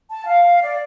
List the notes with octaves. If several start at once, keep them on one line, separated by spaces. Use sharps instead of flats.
A5
F5
D5